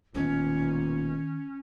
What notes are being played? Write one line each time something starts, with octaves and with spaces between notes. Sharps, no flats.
E1 D#2 A#2 D#3 B3 C#4